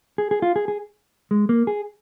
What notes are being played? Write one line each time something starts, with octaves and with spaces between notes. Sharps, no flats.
G#4
G#4
F4
G#4
G#4
G#3
A#3
G#4